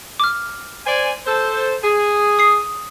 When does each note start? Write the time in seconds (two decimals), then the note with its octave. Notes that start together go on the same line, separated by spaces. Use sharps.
0.20 D6 F6
0.86 C5 D5 G#5
1.26 A4 C5
1.84 G#4
2.39 D#6 C7